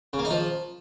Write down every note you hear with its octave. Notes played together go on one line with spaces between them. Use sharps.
C#3
A#3
D#4
F3